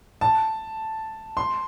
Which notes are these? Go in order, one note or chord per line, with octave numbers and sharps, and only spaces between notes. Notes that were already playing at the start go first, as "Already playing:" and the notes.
A5
C6